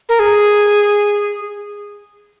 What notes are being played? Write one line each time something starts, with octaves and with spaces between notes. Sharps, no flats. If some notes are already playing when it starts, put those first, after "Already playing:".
A#4
G#4